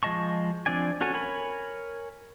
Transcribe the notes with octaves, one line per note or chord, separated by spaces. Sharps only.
F3 G#3 D#5 A5 C#6
F3 C4 D4 D5 G#5
C#4 F#4 A4 C#5 G#5
A#4 C#5 G#5 B5